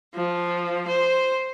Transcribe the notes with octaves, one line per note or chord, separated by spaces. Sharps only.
F3
C5